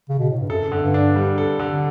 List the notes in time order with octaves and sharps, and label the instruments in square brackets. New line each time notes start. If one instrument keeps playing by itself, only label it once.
[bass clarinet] C#3
B2
A2
G2
[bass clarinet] F#2 [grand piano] A4
[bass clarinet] F#2 [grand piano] D3
[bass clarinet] G2
[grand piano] D4
G3
A4
D3